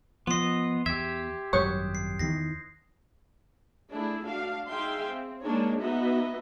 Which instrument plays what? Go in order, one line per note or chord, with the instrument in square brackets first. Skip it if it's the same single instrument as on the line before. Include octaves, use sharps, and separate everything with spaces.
[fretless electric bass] F3 [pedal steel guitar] B3 D#5 [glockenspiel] C6 C7
[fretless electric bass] E2 [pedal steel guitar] G4 E5 [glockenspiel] G#6
[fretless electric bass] G#1 F#2 G3 [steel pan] C#5 C#6 [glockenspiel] D#6 F#6 G6
[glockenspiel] C7
[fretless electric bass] E2 D#3 E3 [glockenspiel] A#6 C7
[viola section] A3 D4 E4 G#4
D4 F#4 F5
D#4 G#4 E5 F5 G5 C6
C4
G#3 A#3 D4 D#4 G#4 C#5
B3 D#4 F#4 B4 D#5 E5